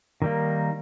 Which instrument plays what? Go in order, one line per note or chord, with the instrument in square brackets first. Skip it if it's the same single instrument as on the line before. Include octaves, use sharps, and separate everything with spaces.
[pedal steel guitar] D#3 G3 A#3